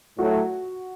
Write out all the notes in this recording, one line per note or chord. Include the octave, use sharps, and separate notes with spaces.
A2 F#3 A3 F#4